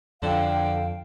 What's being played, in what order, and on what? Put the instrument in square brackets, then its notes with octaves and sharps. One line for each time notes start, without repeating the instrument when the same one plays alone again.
[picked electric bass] F2 [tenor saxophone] D3 [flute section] F5 G5